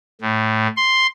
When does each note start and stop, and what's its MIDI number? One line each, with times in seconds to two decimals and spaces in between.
0.21 0.68 45
0.77 1.07 84